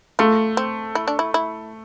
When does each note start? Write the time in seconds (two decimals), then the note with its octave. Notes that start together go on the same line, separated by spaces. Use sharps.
0.19 A3 F4
0.57 C4
0.95 E4
1.08 D4
1.19 E4
1.34 E4